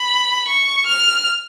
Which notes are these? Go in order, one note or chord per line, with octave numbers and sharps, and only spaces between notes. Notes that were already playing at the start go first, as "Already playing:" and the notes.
Already playing: B5
C#6
F6